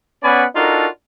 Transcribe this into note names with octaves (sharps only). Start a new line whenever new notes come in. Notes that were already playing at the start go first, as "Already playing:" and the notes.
B3 C#4 D5 F#5 G#5 B5
D4 D#4 F4 F#4 A4 A#4